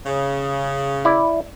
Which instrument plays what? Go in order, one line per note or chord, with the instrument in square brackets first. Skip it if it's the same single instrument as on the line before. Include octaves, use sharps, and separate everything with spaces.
[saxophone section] C#3
[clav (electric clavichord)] E4 D5